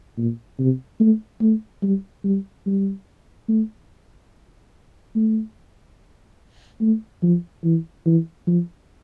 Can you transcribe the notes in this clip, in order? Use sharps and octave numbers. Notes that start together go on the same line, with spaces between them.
A#2
C3
A3
A3
G3
G3
G3
A3
A3
A3
F3
E3
E3
F3